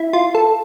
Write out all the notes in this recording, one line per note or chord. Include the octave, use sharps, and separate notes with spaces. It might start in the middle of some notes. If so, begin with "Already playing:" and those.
Already playing: E4
F4
A4